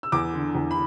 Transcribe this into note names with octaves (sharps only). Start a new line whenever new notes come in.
E6
E2 D6
D3
E2
B5